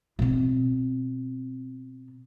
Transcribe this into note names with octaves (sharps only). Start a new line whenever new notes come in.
B2 C4